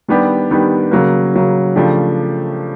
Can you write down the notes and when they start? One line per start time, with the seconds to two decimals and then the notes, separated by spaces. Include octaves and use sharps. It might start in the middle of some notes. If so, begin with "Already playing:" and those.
0.08 D#3 G3 B3 D4 G4
0.51 D#3 G3 B3 D4 G4
0.91 C#3 F#3 A#3
1.34 C#3 F#3 A#3
1.76 C#3 F3 A3 D4 G4